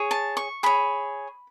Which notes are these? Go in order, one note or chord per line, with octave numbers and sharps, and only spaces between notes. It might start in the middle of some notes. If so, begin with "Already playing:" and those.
Already playing: G#4 C#5
A5
C#6
G#4 C#5 B5